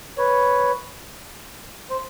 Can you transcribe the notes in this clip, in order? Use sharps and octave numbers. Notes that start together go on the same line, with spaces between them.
B4 C#5
C5